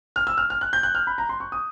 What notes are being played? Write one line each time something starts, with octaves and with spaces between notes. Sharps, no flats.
F6
E6
F6
F6
F#6
G6
F#6
F6
B5
A#5
C6
C#6
D#6